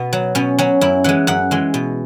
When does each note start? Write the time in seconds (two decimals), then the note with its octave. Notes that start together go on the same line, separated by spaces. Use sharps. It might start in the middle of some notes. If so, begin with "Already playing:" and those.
Already playing: B2 B3
0.13 F#3
0.35 B2 C#4
0.59 F#3 C#4
0.81 F#2 E4
1.04 E3 G#3 F#5
1.27 F#2 F#5
1.51 E3 G#3
1.74 B2